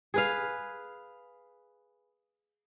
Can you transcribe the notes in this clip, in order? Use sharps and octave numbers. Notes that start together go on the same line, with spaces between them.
G#4 B4 F5